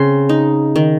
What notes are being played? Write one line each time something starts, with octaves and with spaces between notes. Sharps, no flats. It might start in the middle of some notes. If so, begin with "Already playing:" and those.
Already playing: C#3 C4 C6
D#4
D#3